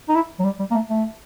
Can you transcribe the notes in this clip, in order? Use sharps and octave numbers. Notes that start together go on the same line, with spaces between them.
D#4
E4
F#3
G3
G3
A#3
A3
A3